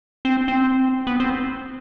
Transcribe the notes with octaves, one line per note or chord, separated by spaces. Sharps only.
C4
C4
B3
C4